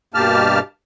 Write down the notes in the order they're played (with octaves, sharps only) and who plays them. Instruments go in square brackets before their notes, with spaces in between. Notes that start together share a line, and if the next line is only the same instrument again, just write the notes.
[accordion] G2 B2 A#3 G4 A5 F6